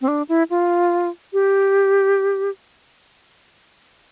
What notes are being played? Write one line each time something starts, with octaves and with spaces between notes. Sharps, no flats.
C4
D4
E4
F4
G4